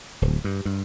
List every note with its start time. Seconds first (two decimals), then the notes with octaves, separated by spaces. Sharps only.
0.22 D1
0.44 G2
0.65 G2